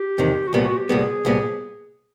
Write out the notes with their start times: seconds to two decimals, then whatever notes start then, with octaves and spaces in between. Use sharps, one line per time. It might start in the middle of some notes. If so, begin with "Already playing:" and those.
Already playing: G4
0.18 E2 C3 D#3
0.48 F#4
0.53 C2 A#2 G3 B3 G4
0.65 F#4
0.77 G4
0.89 C2 A#2 G3 B3 G#4
1.25 C2 A#2 G3 B3